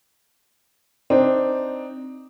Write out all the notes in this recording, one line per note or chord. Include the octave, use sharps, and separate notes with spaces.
C4 D4 D#4